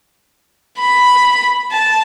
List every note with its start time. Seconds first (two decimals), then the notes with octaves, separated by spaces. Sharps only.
0.79 B5
1.71 A5